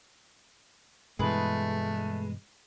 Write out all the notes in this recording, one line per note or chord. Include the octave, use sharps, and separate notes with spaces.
G2 B2 E3 G#3 A3 G#4 B4